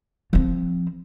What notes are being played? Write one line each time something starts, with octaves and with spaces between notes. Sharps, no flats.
F3 C4